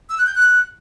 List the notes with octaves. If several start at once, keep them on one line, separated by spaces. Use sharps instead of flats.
E6
F#6
G6
F#6